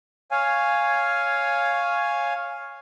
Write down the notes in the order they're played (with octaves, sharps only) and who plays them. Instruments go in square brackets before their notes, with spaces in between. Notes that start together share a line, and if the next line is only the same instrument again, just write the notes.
[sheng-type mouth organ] C#5 F5 G#5